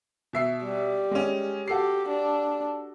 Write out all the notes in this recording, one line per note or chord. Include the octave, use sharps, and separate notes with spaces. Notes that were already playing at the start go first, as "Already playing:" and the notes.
B2 E5 C7
G3
G#3 C#4
F#4 G4 A4 C7
D4